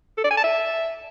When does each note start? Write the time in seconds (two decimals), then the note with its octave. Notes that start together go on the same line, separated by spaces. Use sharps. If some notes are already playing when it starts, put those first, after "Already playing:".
0.18 A4
0.24 D5
0.31 G#5
0.37 A5
0.44 E5